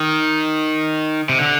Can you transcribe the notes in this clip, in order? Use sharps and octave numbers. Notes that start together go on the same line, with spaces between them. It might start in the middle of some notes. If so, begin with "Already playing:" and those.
Already playing: D#3
C3
D3